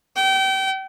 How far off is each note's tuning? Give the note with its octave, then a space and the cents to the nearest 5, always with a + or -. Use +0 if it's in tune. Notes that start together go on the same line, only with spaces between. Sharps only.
G5 -30